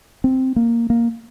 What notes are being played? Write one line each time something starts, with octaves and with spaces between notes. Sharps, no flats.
C4
A#3
A#3